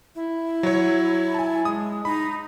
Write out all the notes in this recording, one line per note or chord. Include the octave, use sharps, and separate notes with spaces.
E4
F#3 C#5
G#5 A5
G#3 D#6
D#4 B5